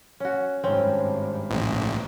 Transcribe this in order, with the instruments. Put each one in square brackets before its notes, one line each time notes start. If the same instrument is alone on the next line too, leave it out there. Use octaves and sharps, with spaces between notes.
[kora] C#4 F#4
[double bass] G#1 G2 [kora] C4 C#4
[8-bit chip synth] A1